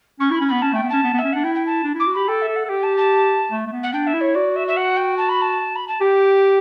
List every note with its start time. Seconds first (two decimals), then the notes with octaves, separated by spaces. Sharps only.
0.20 C#4 C#6
0.31 E4 B5
0.41 C#4
0.48 B3 B5
0.62 C#4 A5
0.73 A3 G5
0.83 B3
0.90 C#4 A5
1.03 B3
1.14 B3
1.18 E5
1.24 C#4
1.33 D4 F#5
1.44 E4 G5
1.55 G5
1.66 A5
1.84 D4
1.94 E4
2.00 D6
2.06 F#4
2.14 G4 B5
2.28 A4 G5
2.42 E5
2.48 A4
2.56 F#5
2.65 A4
2.69 G4 G5
2.83 A5
2.97 A5
3.51 A3
3.66 A3
3.72 B3
3.83 F#5
3.93 D4 G5
4.07 E5
4.14 E4
4.21 C#5
4.34 F#4 D5
4.56 E5
4.68 E5
4.77 F#5
4.97 G5
5.17 A5
5.29 B5
5.41 A5
5.76 B5
5.88 A5
6.01 G4 G5